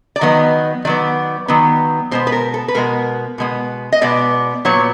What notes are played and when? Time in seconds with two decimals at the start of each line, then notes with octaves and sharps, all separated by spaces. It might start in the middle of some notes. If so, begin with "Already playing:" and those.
0.16 D5
0.21 D#3 F#3 B3 D#5
0.85 D#3 F#3 B3 D5
1.48 D#3 F#3 B3
2.11 B2 G#3 B3 C5
2.27 B4
2.32 A#4
2.54 A4
2.68 B4
2.74 B2 G#3 B3 A#4
3.38 B2 G#3 B3
3.92 D#5
4.01 B2 G#3 B3 D5
4.65 A#2 F#3 B3 C#5